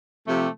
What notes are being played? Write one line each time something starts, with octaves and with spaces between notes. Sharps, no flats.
C3 F3 A3 G4